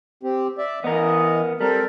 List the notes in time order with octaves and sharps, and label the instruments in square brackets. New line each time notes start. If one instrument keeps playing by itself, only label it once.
[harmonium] C4 G4
D5 E5
[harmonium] E3 D#5 [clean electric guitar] B3 A#4
[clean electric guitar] G3 [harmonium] C4 A4 A#4